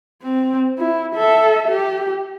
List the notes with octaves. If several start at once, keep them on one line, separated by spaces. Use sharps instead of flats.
C4
E4
A4 E5
G4